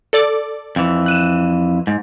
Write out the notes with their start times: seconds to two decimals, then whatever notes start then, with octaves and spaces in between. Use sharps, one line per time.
0.13 A4 D5 D6
0.76 F2 E3
1.06 F#6 D#7 E7
1.87 G#2